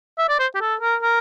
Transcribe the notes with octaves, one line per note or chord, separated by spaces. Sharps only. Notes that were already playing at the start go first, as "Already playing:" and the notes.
E5
D5
C5
G4
A4
A#4
A#4